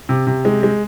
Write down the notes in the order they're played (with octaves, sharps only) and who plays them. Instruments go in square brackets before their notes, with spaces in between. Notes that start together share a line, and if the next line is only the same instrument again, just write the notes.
[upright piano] C3
C3
G#3
G#3